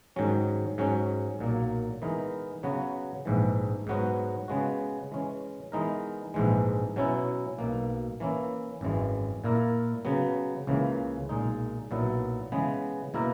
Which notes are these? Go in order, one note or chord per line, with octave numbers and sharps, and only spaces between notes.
G#2 D#3 F#3 C#4
G#2 F#3 C#4
B1 A#2 F#3 A#3
E3 G#3 B3 D#4 A#4
C#3 F#3 B3 F#4 B4
A#1 G#2 E3
G#2 F#3 B3 F#4
C#3 G#3 B3 F#4
E3 G#3 C#4
E3 G#3 B3 D#4 A#4
A#1 G#2 E3 G#3
B2 F#3 C#4 E4
B1 B2 A#3
E3 A#3 C#4 E4
G#1 F#2 E3 G#3
A#2 A#3 E4 A#4
C#3 F#3 B3
C#2 C#3 E3 A#3
B1 A#2 G#3 D#4
B1 A#2 F#3 B3 E4
C#3 E3 G#3 B3
B2 A#3 E4 A#4